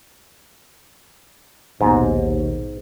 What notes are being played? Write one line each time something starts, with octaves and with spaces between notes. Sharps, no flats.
A#1 D#2 G#2 B2